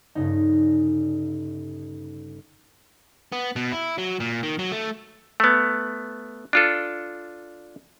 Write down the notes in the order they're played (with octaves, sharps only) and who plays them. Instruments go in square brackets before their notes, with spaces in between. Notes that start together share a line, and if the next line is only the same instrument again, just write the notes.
[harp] G1 G2 C#3 D#4
[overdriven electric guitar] B3
B2
E4
F#3
A#2
D#3
F#3
A3
[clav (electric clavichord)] A3 B3
D4 F4 A4